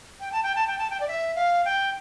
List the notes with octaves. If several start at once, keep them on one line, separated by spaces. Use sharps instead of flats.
G5
A5
G5
A5
G5
A5
G5
D5
E5
F5
G5